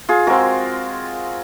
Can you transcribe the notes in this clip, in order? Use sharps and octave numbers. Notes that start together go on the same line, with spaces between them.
F4 G#4
G#3 C4 F4 F#4 A#4